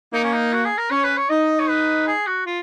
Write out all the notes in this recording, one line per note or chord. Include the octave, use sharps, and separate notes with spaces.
A#3 D#4
C#4
D#4
F#4
G#4
A#4
C#4 C#5
B4
C#5
D#4 D#5
C#5
B4
G#4
F#4
F4